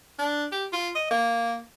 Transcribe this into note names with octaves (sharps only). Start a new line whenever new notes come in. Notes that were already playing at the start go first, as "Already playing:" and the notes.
D4
G4
F4
D#5
A#3